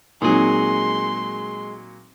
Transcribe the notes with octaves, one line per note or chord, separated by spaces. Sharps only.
A#2 F#3 G#3 C4 D#4 G#4 C6